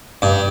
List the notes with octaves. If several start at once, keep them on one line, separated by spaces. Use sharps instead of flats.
G2